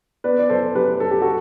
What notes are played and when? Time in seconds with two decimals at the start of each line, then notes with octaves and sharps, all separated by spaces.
0.24 B3 B4 D5
0.39 D5
0.49 F#2 A4 C5
0.75 F#2 G4 B4
1.00 F#2 A4
1.11 G4
1.22 F#4 A4